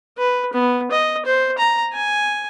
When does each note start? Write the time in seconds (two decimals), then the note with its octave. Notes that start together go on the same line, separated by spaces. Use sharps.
0.18 B4
0.54 B3
0.91 D#5
1.25 C5
1.58 A#5
1.93 G#5